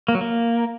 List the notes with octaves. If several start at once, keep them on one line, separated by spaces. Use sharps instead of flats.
A#3
F#3
A#3